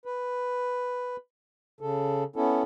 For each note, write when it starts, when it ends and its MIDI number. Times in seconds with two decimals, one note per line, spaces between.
0.06 1.17 71
1.81 2.24 49
1.81 2.24 69
2.36 2.63 59
2.36 2.63 61
2.36 2.63 64
2.36 2.63 69